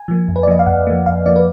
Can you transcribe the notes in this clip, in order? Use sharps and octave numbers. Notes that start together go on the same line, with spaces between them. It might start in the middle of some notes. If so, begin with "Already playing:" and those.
Already playing: G#5
F3 A#3
F2
B4
D5
F3 A#3 D#5
F5
F2 F#5
F3 A#3
F2 F5
F3 A#3 D5
B4